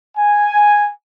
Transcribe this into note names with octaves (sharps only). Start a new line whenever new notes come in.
G#5